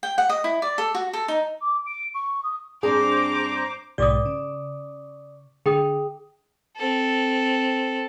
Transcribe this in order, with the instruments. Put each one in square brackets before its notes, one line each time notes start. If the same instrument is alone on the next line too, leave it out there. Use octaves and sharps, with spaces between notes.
[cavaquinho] G5
F#5
D#5
E4
D5
A4
F#4
A4
D#4
[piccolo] D6
D7
C#6
D#6
[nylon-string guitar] G2 C4 D4 [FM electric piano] G#4 [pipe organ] C5 A#5 [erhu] D6
[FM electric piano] B1 G#2 G4 [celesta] D5 D6 D#6
[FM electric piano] C#3
[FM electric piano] D3 [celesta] G#4 G5 D#6
[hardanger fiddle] C4 A4